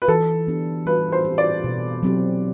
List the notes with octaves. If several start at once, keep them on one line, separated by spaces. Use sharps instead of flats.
B4
E3 A4
B3 D4 G4
G3 B4
C5
C4 E4 G4
D5
B2
F#3 C4 E4 G4